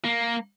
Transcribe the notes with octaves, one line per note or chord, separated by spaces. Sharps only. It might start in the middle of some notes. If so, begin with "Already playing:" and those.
A#3